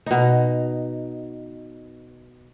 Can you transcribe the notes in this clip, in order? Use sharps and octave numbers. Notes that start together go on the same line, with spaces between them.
B2 D#4